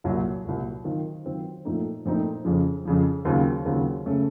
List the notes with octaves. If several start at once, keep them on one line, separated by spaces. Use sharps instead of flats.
C2 A#2 F#3
C2 A#2 F#3
D#3 F#3 C4 F4
D#3 F#3 C4 F4
A#2 F3 A3 C4 D#4
A#2 F3 A3 C4 D#4
F2 C#3 F3
F2 C#3 F3
D#2 C#3 F#3 C4 F4
D#2 C#3 F#3 C4 F4
C#3 A3 C#4 A4